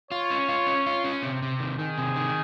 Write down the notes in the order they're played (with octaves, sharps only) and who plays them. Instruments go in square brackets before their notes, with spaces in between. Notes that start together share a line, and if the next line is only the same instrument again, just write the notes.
[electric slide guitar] F4 [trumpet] C#5
[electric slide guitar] C#4
F4
C#4
F4
C#4
C3
C3
D#3
[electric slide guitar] D#3 [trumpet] G#4
[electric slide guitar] C3
D#3